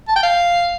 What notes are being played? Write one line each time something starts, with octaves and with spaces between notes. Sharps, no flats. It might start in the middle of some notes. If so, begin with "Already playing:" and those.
A5
G5
F5